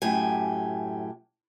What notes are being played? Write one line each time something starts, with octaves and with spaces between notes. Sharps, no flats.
F#2 A2 G4 G#5